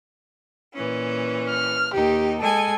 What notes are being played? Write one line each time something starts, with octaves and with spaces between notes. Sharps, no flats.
A#2 E3 C#4
F6
D#2 D#4 G4
G#3 A4 D#5 G#5